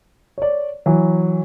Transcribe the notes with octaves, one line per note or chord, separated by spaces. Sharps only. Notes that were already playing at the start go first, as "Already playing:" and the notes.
C#5 D5
E3 F#3